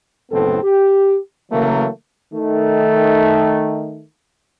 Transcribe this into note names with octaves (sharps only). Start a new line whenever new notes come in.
F#1 A2 B3 C4 A4
G4
C#3 E3 F#3 A3 A#3
D#3 A3